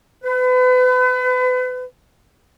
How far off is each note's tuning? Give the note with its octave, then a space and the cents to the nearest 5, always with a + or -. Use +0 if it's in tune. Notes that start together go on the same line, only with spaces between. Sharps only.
B4 +35